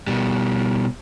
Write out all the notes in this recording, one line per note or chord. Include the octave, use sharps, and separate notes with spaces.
B2 G3